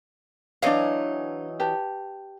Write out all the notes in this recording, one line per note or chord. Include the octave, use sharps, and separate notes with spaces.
E3 F#3 D4 D#4 D#5 F5
G4 B4 A5